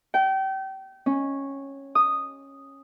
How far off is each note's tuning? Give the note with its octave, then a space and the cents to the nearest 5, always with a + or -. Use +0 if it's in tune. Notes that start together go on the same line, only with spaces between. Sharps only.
G5 -30
C#4 -10
D#6 -5